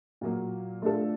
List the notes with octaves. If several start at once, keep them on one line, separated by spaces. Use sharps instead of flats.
A#2 F#3 A#3
A3 D4 F4 A4